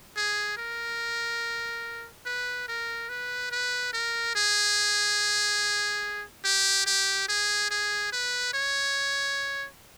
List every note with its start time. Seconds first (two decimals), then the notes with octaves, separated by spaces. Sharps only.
0.16 G#4
0.57 A#4
2.26 B4
2.68 A#4
3.09 B4
3.51 B4
3.93 A#4
4.35 G#4
6.44 G4
6.87 G4
7.28 G#4
7.71 G#4
8.12 B4
8.54 C#5